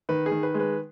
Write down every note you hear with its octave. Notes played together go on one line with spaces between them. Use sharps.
D#3 B4
G#4
D#3
B4
G#3
B4